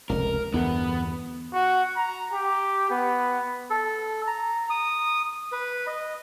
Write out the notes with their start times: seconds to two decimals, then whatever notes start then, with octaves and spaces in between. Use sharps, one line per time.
0.10 F1 C#2 A#4
0.54 E2 G2 D3 B3
1.53 F#4
1.97 A#5
2.33 G4
2.90 B3
3.70 A4
4.27 A#5
4.70 D#6
5.52 B4
5.87 D#5